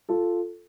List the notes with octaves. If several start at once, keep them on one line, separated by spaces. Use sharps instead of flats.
F4 A4